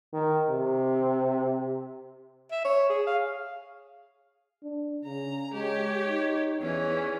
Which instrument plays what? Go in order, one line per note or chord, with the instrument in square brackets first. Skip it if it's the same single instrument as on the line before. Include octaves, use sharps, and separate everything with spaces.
[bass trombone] D#3
C3
[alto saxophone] E5
C#5
G#4
F5
[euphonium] D4
[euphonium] C#3 [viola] A#5
[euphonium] G#3 [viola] G4 C#5
[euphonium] D#4
[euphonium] E2 [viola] E3 C#4